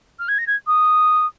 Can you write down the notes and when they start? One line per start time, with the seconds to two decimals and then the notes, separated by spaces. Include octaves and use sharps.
0.19 F6
0.28 G#6
0.38 A#6
0.47 G#6
0.67 D#6